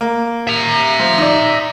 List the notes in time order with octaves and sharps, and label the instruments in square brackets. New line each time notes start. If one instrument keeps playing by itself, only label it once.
[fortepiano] A#3
[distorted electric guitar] E5 A#5
[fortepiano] F3
D#4 D5